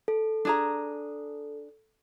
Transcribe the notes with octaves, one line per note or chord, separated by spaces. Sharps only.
A4
D4 G#4 A#5